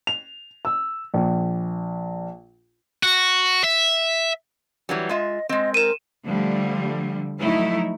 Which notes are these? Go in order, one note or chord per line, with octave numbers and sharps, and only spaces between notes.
F7
E6
A#1
F#4
E5
E3 F#3 G3
G#3 F4 D#5 E5
G#3 C4 D#5
A#4 D#7 E7
D3 F3 G3 A3
F3 F#3 A3 D#4 E4